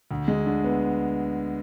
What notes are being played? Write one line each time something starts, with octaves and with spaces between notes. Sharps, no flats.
D2
G#3
D3
B3